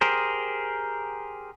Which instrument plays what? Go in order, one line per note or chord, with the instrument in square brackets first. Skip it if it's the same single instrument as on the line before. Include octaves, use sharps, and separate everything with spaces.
[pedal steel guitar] G4 G#4 A#4 C5